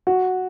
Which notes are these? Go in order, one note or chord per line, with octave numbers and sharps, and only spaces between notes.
F#4